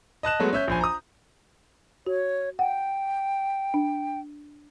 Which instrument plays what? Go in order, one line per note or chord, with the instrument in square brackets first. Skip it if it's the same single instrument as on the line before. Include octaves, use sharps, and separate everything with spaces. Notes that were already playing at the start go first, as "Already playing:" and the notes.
[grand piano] D#5 A5 F#6 E7
F#3 G#3 A3 B3
C#4 E5 G6
A#1 C5 G#5
A#5 D#6
[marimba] F#4 [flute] C#5
[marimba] F#5 [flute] G5
[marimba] D4